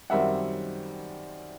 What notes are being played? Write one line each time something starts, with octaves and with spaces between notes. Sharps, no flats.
F#2 D#3 G3 C4 E5 F#5